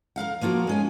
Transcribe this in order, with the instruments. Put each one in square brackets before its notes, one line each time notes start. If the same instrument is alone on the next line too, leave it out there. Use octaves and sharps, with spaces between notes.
[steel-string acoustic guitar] A#4 B4 F5 F#5
F3 A#3 F4 F#4 A#4
G#3 C#4 G#5